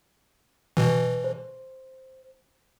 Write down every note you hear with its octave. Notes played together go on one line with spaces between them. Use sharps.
B2 E3 B4
C5